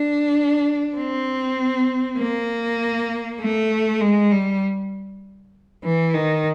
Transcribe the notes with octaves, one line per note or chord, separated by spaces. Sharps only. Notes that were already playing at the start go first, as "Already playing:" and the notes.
Already playing: D4
C4
A#3
A3
G#3
G3
E3
D#3